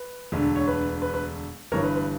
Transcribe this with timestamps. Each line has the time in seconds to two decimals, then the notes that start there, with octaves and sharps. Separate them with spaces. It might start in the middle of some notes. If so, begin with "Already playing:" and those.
Already playing: B4
0.32 E1 D2 D3
0.56 C#5
0.67 B4
1.02 B4
1.14 B4
1.72 G1 G2 E3 A#4 C#5
1.83 B4
1.95 B4